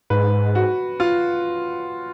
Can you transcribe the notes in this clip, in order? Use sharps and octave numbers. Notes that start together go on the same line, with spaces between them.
G#2 B4
F#4
F4